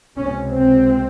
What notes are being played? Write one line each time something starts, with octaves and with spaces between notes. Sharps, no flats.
C#2 C3 C#4
C4